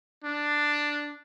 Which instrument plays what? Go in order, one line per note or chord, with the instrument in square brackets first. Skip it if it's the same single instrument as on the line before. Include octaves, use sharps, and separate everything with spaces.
[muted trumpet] D4